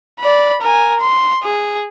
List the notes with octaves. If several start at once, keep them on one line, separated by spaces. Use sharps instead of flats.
D5 B5
A#4 G#5
C6
G#4